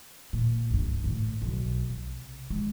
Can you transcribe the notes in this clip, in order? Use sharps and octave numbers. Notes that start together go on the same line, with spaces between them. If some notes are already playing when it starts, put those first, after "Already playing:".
A#2
C2 G2
G#1 A2
B1
C3
G#3